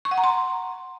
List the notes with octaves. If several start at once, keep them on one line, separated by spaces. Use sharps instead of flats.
C#6
F#5
A#5
C6